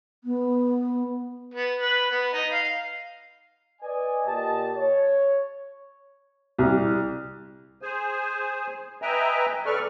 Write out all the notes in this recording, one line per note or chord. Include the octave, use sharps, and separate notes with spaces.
B3
B3
B4
B3
D#4
F5
B4 D5 D#5 G#5
A#2 G4 D#5 A5
C#5
C2
G#4 C5 G#5
B4 D#5 E5 G5 G#5 A#5
C#3 A4 B4 D5 C#6 F6